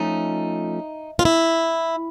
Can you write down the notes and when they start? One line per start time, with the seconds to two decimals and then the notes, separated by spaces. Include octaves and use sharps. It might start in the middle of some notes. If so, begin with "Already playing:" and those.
Already playing: F3 A3 C#4 D#4
1.19 F4
1.25 E4